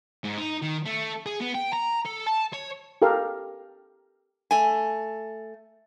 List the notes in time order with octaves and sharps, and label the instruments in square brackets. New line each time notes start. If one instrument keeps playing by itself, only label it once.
[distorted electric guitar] G#2
D#4
D#3
A3
G#4
B3
G5
A#5
A4
A5
C#5
[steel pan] G4 A4 A#4 F5
[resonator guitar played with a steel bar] A3 G#5